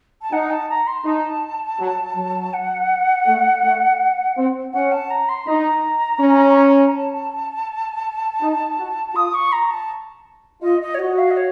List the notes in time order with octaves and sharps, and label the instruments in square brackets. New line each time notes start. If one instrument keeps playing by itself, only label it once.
[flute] A5
[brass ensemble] D#4 [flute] F#5
[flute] A5
A#5
C6
[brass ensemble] D#4 [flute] A5
[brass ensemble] F#3
F#3
[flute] F#5
[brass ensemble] A3
A3
C4
[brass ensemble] C#4 [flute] F#5
[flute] A5
A#5
C6
[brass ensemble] D#4 [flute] A#5
[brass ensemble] C#4
[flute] A5
[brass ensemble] D#4
F#4
[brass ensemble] F4 [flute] D#6
[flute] C#6
A#5
A5
[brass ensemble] F4 [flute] D#5
[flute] D#5
C#5
[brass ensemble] F#4 [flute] D#5
[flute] F5
D#5
C#5